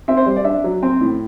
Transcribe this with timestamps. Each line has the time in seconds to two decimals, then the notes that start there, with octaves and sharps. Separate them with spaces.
0.08 C4 E5
0.17 C5
0.26 G3
0.36 D5
0.44 D4 E5
0.64 F#3
0.83 C4
1.01 A2